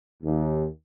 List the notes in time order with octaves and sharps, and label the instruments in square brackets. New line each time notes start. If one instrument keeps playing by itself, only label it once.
[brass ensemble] D#2